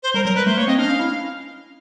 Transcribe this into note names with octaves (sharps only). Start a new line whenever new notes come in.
C5
G3 A#4
F#3 A#4
G3 B4
A3 C5
A#3 C#5
C4 D#5
D4 F5
C#4
E4